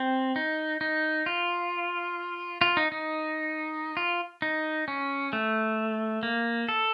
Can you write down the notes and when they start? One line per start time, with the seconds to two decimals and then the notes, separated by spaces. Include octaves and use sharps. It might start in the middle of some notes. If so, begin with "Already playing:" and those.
Already playing: C4
0.36 D#4
0.81 D#4
1.26 F4
2.61 F4
2.77 D#4
2.92 D#4
3.97 F4
4.42 D#4
4.88 C#4
5.33 A3
6.23 A#3
6.69 A4